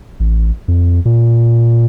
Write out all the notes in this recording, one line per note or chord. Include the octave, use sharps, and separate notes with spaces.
A1
F2
A#2